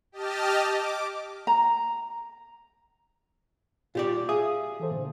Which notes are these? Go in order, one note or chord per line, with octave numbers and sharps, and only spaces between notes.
G4 D#5 A5 F6
D6
A#5
A#2 F4 G4 D5
G#4 E5 F5 D#6
E3 A4 C5
A#2 D3